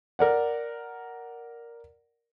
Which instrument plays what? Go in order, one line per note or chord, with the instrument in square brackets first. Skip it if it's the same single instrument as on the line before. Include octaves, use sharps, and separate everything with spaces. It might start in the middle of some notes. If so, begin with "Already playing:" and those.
[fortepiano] A#4 D5 F#5